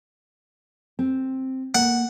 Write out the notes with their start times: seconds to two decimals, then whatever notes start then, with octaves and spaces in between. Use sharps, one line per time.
0.99 C4
1.75 A#3 F#5